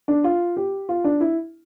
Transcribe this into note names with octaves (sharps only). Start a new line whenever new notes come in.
D4
F4
G4
F4
D4
E4